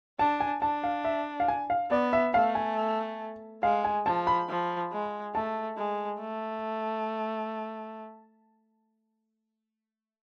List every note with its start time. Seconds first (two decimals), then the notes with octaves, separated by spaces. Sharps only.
0.19 D4 A5
0.40 G#5
0.62 D4 A5
0.84 F5
1.05 E5
1.40 F5
1.48 G#5
1.70 F5
1.90 B3 D5
2.13 E5
2.34 A3 F5
2.55 G#5
3.63 G#3 F5
3.85 G#5
4.06 F3 A5
4.27 B5
4.49 F3
4.92 G#3
5.35 A3 A5
5.77 G#3
6.20 A3